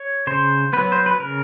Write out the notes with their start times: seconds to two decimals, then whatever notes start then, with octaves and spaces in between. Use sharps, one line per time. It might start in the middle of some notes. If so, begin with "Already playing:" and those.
Already playing: C#5
0.27 C#3 C5
0.73 F#3 B3 B4
0.92 C5
1.06 B4
1.20 C#3 A#4